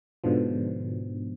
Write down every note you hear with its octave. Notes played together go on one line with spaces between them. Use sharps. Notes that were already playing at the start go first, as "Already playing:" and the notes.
G#2 B2 D3 F3